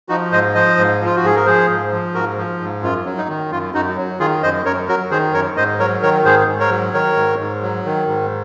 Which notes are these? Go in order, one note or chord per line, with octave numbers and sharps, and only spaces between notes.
F3 D#4 F#4
G#2 C5 D#5
F3 C5 D#5
G#2
F3 F4
F#4
G#2 G#4
A#4
F3 G#4 C5
G#2
F3
G#2 F#4 A#4
F3
G#2
F#2 F4
F#3
D#4
D#3
F#2 F4
F#2 D#4 F#4
F#3
D#3 F4 G#4
F#2 C5 D#5
F#2 A#4 C#5
F#3 F#4 A#4
D#3 G#4 C5
F#2 A#4 C#5
G#2 C5 D#5
F#3 A#4 C#5
D#3 A#4 C#5
G#2 G#4 C5
G#2
A#4 C#5
F#3
D#3 A#4 C#5
G#2
G#2
F#3
D#3
G#2